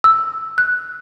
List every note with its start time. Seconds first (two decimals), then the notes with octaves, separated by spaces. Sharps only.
0.04 E6
0.58 F#6